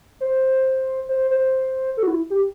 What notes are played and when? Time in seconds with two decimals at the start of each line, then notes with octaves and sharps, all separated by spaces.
0.21 C5
1.09 C5
1.31 C5
1.97 A4
2.03 F#4
2.08 E4
2.30 G4